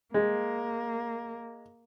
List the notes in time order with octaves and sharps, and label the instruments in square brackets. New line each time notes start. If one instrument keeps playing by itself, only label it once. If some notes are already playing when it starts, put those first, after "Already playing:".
[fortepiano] G#3 [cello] A#3